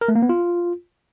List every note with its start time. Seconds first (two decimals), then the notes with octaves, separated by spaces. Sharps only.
0.01 A#4
0.08 A3
0.15 A#3
0.22 B3
0.29 F4